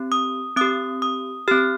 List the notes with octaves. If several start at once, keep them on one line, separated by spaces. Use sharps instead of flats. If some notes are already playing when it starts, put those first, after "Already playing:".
Already playing: C4 G4
D#6
C4 G4 D#6
D#6
C4 G4 F6